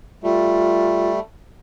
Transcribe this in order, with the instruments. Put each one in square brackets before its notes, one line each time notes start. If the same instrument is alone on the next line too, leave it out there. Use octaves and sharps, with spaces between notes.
[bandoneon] G3 A3 [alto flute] F4